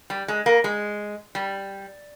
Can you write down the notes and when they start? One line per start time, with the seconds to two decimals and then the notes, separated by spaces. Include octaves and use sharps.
0.10 G3
0.28 G#3
0.46 A#3
0.64 G#3
1.35 G3